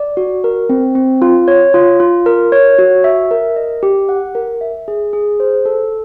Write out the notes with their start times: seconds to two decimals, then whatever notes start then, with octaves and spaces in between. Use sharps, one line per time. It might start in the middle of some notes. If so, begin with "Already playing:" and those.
Already playing: D5
0.17 F#4
0.44 A#4
0.69 C4
0.95 C4
1.22 F4
1.48 C#5
1.74 F4
2.00 F4
2.26 A#4
2.52 C#5
2.79 F#4
3.04 E5
3.31 A#4
3.56 D#5
3.83 G4
4.09 F#5
4.35 A#4
4.61 E5
4.88 G#4
5.13 G#4
5.40 C5
5.65 A4